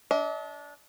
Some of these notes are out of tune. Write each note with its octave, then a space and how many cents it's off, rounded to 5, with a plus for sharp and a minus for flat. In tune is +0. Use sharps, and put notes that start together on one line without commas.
D4 -20 D#5 +45